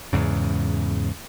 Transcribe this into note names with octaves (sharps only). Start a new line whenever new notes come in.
E2 G#2 C#3